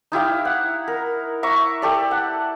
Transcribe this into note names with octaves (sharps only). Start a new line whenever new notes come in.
D#4 E4 G4 F5
F#5
A#4
E5 A#5 C#6 D6
G4 A4 D5
F#5